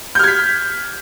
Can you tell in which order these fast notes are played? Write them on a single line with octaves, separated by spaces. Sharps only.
G6 F6 G#6 B6